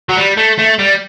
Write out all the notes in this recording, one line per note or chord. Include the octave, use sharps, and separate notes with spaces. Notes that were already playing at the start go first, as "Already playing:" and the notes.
F#3
G3
A3
A3
G3